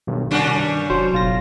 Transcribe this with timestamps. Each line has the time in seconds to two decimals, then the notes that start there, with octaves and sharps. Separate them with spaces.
0.07 B1 G2 D#3
0.31 C2 G3 C#4 D4 F#4
0.55 G2 C#6
0.90 F1 F#3 C5
1.12 F#1 B1 F4 A#6